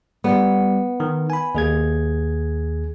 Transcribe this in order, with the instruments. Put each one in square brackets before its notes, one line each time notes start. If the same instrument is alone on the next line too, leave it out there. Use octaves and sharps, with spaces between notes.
[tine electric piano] G3 [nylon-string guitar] B3
[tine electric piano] D#3
G#5 B5
D#2 G#4 G#6